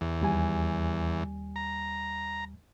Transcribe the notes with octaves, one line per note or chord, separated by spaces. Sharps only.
E2
D#2 G3 G#5
A#5